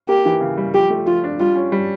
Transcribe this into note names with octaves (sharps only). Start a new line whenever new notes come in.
A#3 G4
E3
C#3
G3
F3 G4
A3
F3 F4
D4
G3 F4
C#4
G3